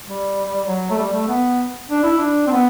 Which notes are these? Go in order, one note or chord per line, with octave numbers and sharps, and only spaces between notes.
G3
F#3
A3
G3
A3
B3
D4
E4
D4
C4
B3